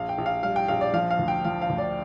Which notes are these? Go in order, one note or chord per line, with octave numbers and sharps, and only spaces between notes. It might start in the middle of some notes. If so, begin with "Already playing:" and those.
Already playing: A#1 F5
G5
A#1
F5
G3 F5
G5
A#1 F5
D5
F3 F5
F5
D2
G5
F3 F5
F5
D2
D5